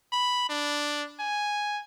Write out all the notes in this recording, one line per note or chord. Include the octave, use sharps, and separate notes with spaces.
B5
D4
G#5